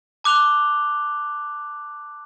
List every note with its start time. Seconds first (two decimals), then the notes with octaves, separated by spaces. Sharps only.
0.24 A5 D6 F#6 F7 G7